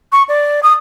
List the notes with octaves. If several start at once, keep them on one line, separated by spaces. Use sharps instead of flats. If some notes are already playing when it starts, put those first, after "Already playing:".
C#6
D5
D#6